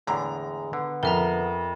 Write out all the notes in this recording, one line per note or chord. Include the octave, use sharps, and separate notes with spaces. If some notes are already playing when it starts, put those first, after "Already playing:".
E2 A2 D3 G#3 A#5
D3 B3
F2 A#4 E5 A#5